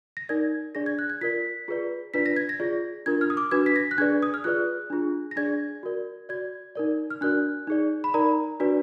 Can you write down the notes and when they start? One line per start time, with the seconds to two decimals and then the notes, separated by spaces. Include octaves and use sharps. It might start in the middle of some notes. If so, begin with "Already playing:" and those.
0.17 A#6
0.29 D#4 A#4 D5 G#6
0.75 D4 G#4 D5 A#6
0.86 G#6
0.99 F#6
1.10 G#6
1.21 F4 A#4 D5 B6
1.68 F4 G#4 B4 D5
2.14 D4 F4 B4 D5 B6
2.26 A#6
2.37 G#6
2.49 A#6
2.60 F4 G#4 D5
3.06 D4 F4 A#4 G#6
3.21 F6
3.30 D#6
3.37 D6
3.51 D4 F#4 B4 G#6
3.66 B6
3.76 A#6
3.91 F#6
3.98 D4 G#4 B4 D5 G#6
4.22 D#6
4.34 F6
4.44 F4 G#4 B4 D5 F#6
4.90 D4 F4 G#4
5.31 A#6
5.36 D4 G#4 D5 G#6
5.83 F#4 A#4 D5
6.29 F#4 D5 G#6
6.75 D#4 A#4 D5
7.10 F6
7.21 D4 F#4 A#4 D5 F#6
7.67 D#4 G#4 D5
8.04 B5
8.14 D#4 A#4 D5 A#5
8.60 D4 F#4 B4 D5